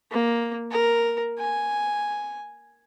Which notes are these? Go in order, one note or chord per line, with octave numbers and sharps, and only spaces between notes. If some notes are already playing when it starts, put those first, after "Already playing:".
A#3
A#4
G#5